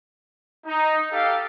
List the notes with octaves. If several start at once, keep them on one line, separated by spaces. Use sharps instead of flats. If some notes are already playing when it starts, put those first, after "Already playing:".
D#4
G4 A4 F5